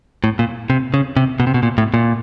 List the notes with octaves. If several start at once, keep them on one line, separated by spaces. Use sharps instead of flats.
A2
A#2
C3
C#3
C3
B2
C3
B2
A#2
A2
A#2